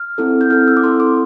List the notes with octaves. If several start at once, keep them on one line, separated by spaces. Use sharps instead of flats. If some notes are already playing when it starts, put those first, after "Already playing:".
Already playing: F6
C4 E4 A4
G6
C4 E4 A4 F6
E6
D6
C4 E4 A4 C6
D6